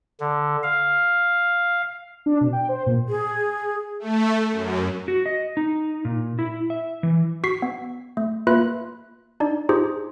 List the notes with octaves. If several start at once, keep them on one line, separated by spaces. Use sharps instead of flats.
D3
F5
D4
B2
G5
C5
A#2
G#4
A3
F#2
F#4
D#5
D#4
A#2
E4
E5
E3
F#4 C#6 B6 C7
B3
A3
A#3 F4 B4 E5 B5 F#6
D4 D#4 D5
D#4 F4 G4 G#4 C5